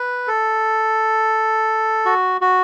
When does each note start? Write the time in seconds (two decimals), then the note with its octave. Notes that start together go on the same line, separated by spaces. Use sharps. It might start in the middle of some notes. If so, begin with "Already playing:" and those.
Already playing: B4
0.27 A4
2.06 F#4
2.41 F#4